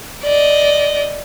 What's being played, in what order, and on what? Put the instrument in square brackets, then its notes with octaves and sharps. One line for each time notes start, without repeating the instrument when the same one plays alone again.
[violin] D5 D#5